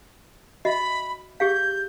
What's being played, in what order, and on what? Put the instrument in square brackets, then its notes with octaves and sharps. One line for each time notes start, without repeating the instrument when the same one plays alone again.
[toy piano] F#4 D#5 E5 [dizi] B5
[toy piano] G4 G#4 F5 [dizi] G6